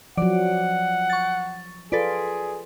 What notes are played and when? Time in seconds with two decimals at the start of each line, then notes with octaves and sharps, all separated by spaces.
0.17 F3 F#3 D5 F#5
1.10 C#6 A6
1.92 F4 G#4 A4 B4 D5